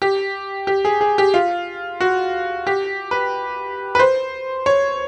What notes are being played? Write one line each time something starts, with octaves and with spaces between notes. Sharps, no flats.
G4
G4
G#4
G#4
G4
F4
F#4
G4
B4
B4
C5
C#5